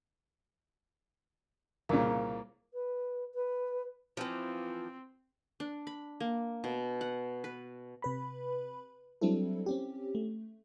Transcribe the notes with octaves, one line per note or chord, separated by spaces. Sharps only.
C2 A#2 C#3 A#3
B4
B4
E3 F3 C4
D4
B5
A#3
B2
F#5
B4
C3 B4 B5
F#3 G3 C4 D4 E4 A4
C4 C#4 G4
A3